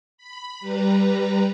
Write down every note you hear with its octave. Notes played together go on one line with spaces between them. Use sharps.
B5
G3 B4 A#5